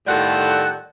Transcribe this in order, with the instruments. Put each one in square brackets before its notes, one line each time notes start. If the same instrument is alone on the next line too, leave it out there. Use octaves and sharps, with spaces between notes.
[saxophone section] A2 D#3 G3 F4 A4 F#5